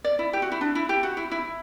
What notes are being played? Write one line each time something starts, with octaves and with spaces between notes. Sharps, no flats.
D5
E4
G4
F#4
E4
D4
E4
G4
F#4
E4
E4